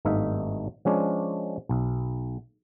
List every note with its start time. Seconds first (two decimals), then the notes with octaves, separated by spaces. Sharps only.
0.05 G#1 G2 A3 D#4 E5 F5
0.85 F3 G#3 C#4 D4
1.69 B1